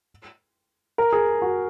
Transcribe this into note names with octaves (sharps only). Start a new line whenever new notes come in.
A#4
G#4
F#4